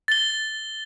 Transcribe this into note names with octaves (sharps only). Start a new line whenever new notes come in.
A6 G7